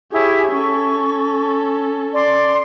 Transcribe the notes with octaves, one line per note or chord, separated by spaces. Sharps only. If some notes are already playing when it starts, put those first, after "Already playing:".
E4 G4 G#4 C#5
C#4 A4 C#6
D5 C6 D6